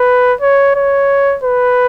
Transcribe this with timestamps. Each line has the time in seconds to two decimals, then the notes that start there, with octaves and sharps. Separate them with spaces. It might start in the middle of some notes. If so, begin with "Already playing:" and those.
Already playing: B4
0.41 C#5
0.76 C#5
1.44 B4